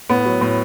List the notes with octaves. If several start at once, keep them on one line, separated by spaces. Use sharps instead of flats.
A2 B3
F#3
A2